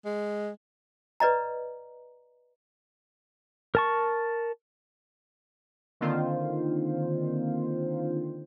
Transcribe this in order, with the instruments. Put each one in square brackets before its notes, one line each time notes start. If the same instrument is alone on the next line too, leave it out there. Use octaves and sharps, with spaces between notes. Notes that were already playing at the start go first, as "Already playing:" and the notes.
[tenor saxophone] G#3
[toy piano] B4 D5 D#5 A#5
[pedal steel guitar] A#4 A5 C#6
[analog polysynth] D3 D#3 A#3 C4 F4 C5